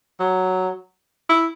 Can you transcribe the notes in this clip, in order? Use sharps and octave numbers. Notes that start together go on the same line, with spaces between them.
F#3
E4